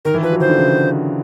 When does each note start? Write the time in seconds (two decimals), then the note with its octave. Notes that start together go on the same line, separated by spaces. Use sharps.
0.05 D#3 A#4
0.14 E3
0.23 F3 B4
0.32 F#3
0.40 D#3 C5
0.49 D3
0.58 C#3